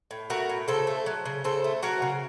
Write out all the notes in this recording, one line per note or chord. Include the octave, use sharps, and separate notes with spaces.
A2
A3 F#4 A#4
A2
C#3 A4 C5
A3
F#3
C#3
C#3 A4 C5
A3
F#3 F#4 A#4
C#3